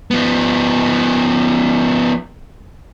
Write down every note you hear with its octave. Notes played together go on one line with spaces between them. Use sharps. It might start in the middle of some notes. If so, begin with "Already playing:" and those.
F3 B3